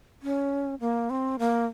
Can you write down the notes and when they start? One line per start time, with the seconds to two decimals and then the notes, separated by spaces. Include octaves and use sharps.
0.23 C#4
0.80 A#3
1.10 C4
1.39 A#3